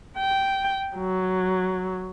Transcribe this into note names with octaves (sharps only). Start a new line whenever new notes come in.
G5
F#3